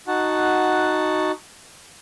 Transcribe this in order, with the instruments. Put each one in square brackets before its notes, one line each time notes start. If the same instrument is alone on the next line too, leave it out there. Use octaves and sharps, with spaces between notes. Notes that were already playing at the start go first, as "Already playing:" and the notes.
[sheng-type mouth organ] D#4 F#4 F#5 A5